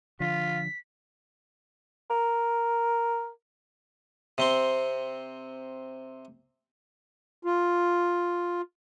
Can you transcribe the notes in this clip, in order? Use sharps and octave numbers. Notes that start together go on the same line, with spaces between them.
D3 F3 F4 B6
A#4
C3 C4 C6
F4